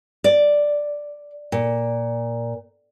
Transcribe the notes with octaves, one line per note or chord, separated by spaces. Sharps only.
D5
A#2